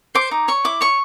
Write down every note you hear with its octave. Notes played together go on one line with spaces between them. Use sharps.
C5 D6
D#4
C#5 C#6
E4 D6
C#5 C#6